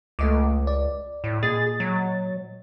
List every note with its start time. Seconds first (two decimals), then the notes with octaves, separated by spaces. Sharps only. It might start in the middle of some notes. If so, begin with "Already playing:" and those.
0.19 C#2 A3 D#5 D6
0.67 D5
1.24 A2
1.43 A#2 G#4 D#5 A6
1.80 F#3